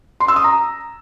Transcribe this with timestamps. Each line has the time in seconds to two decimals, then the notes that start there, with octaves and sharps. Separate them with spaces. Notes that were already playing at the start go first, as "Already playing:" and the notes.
0.20 C6
0.28 E6
0.36 D#6
0.44 A#5